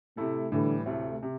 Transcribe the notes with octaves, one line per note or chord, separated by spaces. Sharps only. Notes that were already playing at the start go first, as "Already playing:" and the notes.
A2 C3 A3 E4 A4
A2 D3 E3 G3
D2 A2 C3 A3
C3